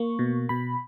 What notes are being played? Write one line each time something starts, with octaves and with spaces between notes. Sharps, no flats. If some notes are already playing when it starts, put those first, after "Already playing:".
Already playing: A#3 C#6
B2
B2 B5